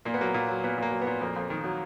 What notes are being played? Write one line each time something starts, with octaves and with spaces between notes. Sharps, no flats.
A#2 A#3
B3
F#3 A#3
A#2
F#3
A#2 B3
A#2 A#3
F#3
B3
A#2
F2 A#3
F2
D#3
F#3